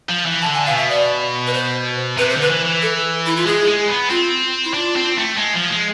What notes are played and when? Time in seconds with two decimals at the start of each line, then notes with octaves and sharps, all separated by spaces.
0.09 F3
0.26 E3
0.41 D3 A5
0.53 G#5
0.65 B2 F5
0.77 E5
0.89 D5
1.47 B4
1.53 C5
2.18 C3 B4
2.29 C5
2.34 D3
2.41 B4
2.50 E3
2.65 E3
2.82 A4
3.26 E4
3.36 F4
3.45 G#3 G#4
3.68 G#3
3.88 B3
4.10 C4 F4
4.64 E4
4.74 D4 F4
4.96 C4
5.17 A3
5.38 G#3
5.55 F3
5.71 G#3